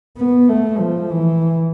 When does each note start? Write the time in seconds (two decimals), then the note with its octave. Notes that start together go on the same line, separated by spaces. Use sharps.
0.18 B3
0.48 A3
0.79 F3
1.09 E3